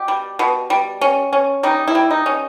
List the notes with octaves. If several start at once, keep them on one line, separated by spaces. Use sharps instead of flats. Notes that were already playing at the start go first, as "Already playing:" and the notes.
Already playing: B2 G4
G3
B2
G3
C#4
C#4
G3 D#4
E4
G3
D#4
C#4